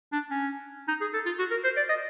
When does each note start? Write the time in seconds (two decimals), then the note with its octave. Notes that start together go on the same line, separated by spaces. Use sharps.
0.12 D4
0.31 C#4
0.88 D#4
1.01 G#4
1.14 A4
1.26 F4
1.39 F#4
1.51 A#4
1.64 C5
1.77 D5
1.89 D#5